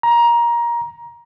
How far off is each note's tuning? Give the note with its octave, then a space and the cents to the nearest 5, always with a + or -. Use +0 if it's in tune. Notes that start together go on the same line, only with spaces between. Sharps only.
A#5 +20